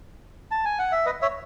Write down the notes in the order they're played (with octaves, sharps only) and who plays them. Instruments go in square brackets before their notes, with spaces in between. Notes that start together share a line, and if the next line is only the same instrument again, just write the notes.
[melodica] A5
G#5
F#5
E5
B4 D#5
C#5 E5